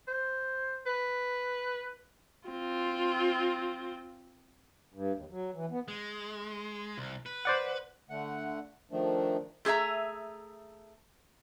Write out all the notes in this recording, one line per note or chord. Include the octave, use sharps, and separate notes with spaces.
C5
B4
C4 F4
G2
D#2
F#3
E3
B3
G#3
C2
B4
C5 D5 F#5
D3 A3 F#5
D#3 F3 A3 D4
A3 G#4 B4 E5 A#5